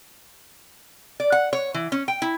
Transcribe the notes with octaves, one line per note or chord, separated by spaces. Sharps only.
D5
F#5
C#5
E3
C#4
G5
E4